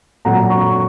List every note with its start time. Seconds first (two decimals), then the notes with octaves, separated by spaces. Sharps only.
0.25 A#2 F#3 F#5 A#5
0.50 A#5 C#6